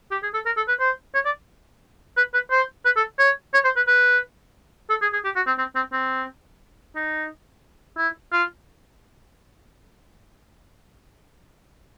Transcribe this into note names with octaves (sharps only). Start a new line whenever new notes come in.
G4
G#4
A4
A#4
A4
B4
C5
C#5
D5
B4
B4
C5
B4
A4
C#5
C#5
C5
B4
B4
A4
G#4
G#4
G4
F#4
C4
C4
C4
C4
D#4
E4
F4